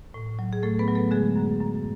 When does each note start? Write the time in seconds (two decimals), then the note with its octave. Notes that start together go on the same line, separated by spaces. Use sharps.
0.14 A2
0.39 F#3
0.53 G#4
0.63 A2 A3 A4
0.79 B3 B4
0.88 F#3
0.95 A3 A4
1.11 D3 G#3 G#4
1.36 F#2
1.60 F#2